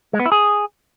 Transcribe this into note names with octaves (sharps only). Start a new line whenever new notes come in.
G#3
B3
E4
G#4